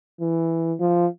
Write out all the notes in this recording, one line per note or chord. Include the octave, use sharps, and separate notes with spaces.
E3
F3